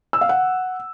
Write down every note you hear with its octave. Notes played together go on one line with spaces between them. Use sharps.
E6
F5
F#5